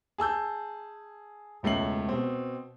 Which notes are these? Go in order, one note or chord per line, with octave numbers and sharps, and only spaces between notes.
G#4 A5 E6 G6
E1 C#2 A3 C#4 C7 F#7
B2 C4